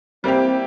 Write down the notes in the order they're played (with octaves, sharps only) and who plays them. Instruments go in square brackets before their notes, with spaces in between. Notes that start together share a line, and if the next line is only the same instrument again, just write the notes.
[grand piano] G3 A#3 E4 G4 [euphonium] C4